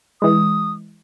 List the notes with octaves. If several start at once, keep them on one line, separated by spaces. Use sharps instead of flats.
E3 G#3 D#6